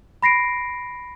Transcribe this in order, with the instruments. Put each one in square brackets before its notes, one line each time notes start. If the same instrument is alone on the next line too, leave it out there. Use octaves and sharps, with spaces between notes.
[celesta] B5 A#6 C7 D7